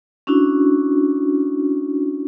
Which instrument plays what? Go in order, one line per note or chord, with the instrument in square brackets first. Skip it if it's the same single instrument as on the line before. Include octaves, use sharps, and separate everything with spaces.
[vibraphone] C#4 D4 E4 F#4